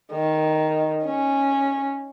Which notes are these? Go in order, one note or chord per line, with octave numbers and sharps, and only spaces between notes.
D#3
C#4